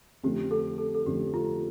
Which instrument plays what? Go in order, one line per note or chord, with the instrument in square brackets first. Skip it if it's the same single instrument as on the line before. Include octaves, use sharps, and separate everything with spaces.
[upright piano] F2 D3 A3 C4 [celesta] G4
[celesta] A4
A4
A4
[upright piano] F2 D3 A3 C4 [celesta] G4
[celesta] F4